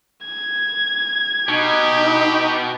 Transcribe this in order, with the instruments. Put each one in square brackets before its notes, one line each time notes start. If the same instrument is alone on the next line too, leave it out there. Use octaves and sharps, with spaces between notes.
[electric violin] G#6
[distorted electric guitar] B2 [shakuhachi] D#4 [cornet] G4